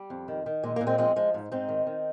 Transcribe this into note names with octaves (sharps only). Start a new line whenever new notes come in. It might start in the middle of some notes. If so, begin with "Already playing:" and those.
Already playing: G3
F2
D#3
D#3
A#2 G#3
A#2 A#3
G#3 C4
F3 G#3 C4
F3 G#3
G#2
G#2 C4 D#4
D#3
D#3